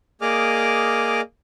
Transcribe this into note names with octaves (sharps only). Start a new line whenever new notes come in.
A#3 G#4 D5 D#5 D6 F6